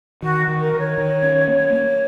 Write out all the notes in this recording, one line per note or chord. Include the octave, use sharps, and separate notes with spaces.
D#3 F#4
D#3
A#4
D#3
C#5
D#3
C#4
A#3
A#3